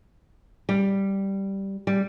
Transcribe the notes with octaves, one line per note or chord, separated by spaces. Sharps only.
G3
G3